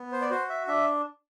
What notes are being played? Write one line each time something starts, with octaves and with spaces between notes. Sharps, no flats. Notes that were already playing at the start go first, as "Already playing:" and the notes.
Already playing: B3
C5
D5
F#4 C5
E5
D4 E5